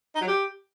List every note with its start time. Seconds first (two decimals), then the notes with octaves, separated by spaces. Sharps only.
0.15 D#4
0.21 F#3
0.28 G4